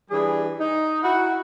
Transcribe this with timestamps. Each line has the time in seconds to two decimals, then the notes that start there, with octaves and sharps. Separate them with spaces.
0.11 E3 G3 D4 G#4
0.60 D#4
1.03 E4 F#4 F#5